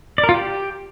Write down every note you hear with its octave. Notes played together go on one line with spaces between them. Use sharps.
D5
A#4
F4
G4